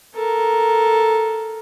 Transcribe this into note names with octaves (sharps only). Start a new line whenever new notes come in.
A4 A#4